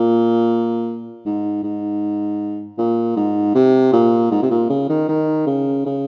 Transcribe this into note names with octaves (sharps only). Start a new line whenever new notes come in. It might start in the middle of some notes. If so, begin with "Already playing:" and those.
Already playing: A#2
G#2
G#2
A#2
G#2
C3
A#2
G#2
C3
A#2
C#3
D#3
D#3
C#3
C#3